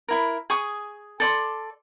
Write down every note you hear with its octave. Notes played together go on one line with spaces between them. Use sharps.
E4 A#4
G#4 C#6 D#6
A4 D5 C6